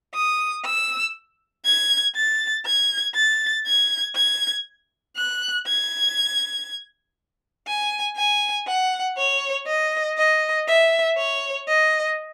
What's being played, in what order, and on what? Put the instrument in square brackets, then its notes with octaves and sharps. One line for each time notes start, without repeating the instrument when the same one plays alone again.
[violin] D#6
E6
G#6
A6
G#6
A6
G#6
G#6
F#6
G#6
G#5
G#5
F#5
C#5
D#5
D#5
E5
C#5
D#5